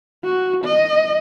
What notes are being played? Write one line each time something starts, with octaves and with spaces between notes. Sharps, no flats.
F#4
D#5